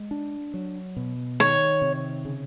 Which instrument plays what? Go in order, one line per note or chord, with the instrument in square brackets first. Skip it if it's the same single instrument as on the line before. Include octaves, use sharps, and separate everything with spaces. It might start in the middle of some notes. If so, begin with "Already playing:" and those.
Already playing: [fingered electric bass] G#3
D4
F#3
B2
[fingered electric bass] D#3 [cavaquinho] C#5
[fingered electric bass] C3
C#3